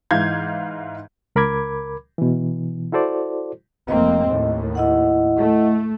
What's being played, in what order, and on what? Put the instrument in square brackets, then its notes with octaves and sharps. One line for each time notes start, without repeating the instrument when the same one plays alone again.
[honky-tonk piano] G#2 E3 F5 G6 G#6
[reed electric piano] C#2 A#4 B5 D6 G#6
B2 E3
E4 F#4 A4 C5 D5
[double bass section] F1 A#3 C4 [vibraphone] D#5
[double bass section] D#2 A2
[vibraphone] E4 D#5 F#5
[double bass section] A3